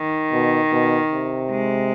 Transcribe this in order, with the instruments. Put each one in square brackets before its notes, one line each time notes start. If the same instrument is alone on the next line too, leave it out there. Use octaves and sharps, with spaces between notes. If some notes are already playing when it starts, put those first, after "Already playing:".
Already playing: [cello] D#3
[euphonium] B2
B2
C3
[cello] G#3